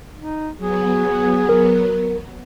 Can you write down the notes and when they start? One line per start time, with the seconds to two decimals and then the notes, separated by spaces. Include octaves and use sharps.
0.17 D#4
0.58 F#3 B3 G#4
1.49 A#4